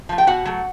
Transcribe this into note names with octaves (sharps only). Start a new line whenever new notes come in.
F3 A3
G5
B2 F#4 F#5
F#3 A3